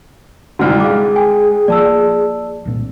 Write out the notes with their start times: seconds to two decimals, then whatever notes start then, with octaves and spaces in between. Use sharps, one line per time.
0.59 C2 G#2 D3 F#4 F6
0.80 G#3 G#4 F5 D6
1.16 G5 G#5
1.68 F3 A#3 D5 A5 E6
2.65 C2 A#2 C4